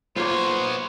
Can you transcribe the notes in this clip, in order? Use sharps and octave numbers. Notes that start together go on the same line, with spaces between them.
A#3 B3 F4 C5 C#5